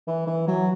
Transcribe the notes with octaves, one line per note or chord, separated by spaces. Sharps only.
E3
E3
F#3